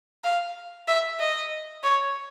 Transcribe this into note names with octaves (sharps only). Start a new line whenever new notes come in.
F5
E5
D#5
C#5